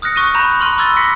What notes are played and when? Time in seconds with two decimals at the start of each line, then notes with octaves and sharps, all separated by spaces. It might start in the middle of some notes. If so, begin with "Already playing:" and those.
0.02 D#6 F6 F#6 A#6 C#7
0.16 C#6 F#6 A#6 D#7
0.35 A#5 B5 F#6 G6
0.60 B5 C6 F6 D#7
0.78 D6 E6 G#6 A6 G7
0.97 C6 A#6 B6 C#7